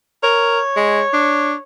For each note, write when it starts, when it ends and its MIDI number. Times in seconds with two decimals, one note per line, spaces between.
0.23 0.60 70
0.23 1.62 73
0.76 1.01 56
1.13 1.54 62